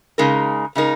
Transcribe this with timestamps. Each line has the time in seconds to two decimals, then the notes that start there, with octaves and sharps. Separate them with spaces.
0.18 C#3 G#3 D#4 A#4
0.75 C#3 G#3 D#4 A#4